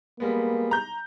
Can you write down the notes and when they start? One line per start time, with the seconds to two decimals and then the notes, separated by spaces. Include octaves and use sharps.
0.20 G3 G#3 A#3 B3
0.71 A#5 G6